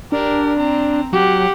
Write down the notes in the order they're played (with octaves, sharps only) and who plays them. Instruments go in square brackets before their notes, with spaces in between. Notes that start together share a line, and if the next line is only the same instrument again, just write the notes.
[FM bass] D4 [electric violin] G4 A#4
[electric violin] C4 A#5
[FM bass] F#3 [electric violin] G4 F#5